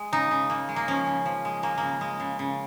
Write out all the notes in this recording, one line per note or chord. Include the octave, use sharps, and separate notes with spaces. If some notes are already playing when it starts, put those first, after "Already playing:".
Already playing: G#3
C#3 D#4
C#3
C#3 A#3
G#3
A#3
F3 C#4
C#3
F3
G#3
G#3 A#3
C#3 A#3
G#3
C#3
C#3